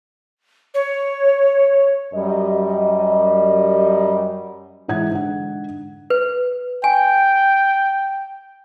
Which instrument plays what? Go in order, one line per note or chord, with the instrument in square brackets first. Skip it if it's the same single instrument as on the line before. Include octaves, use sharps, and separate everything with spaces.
[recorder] C#5
[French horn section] F#2 G3 D#5
[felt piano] G#2 E3 F#5 G#6
G#2 D3 F#5
[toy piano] B4
[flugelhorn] G5 [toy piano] G#5